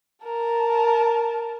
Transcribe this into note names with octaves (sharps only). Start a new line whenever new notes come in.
A#4 A5